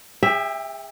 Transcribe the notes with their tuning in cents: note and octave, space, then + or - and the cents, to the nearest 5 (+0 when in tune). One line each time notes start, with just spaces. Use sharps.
G#4 -35 E5 +0 G5 +20